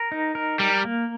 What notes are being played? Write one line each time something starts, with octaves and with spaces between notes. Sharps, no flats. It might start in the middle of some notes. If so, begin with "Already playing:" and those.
Already playing: A#4
D#4
A#4
G3 A#4
A#3